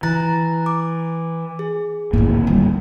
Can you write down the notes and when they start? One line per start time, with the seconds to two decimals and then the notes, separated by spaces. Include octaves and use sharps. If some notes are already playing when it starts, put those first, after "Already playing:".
0.03 E3 A#5 F#6 A6
0.66 D6
1.59 G#4
2.13 D1 G#1 A#3 D#4 E4
2.47 G3